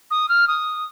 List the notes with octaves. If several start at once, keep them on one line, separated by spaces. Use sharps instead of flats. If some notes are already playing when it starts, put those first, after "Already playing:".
D#6
F6
D#6